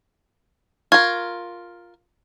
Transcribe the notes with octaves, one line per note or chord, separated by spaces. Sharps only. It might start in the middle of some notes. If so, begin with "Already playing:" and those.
F4 A#4 C#6 G#6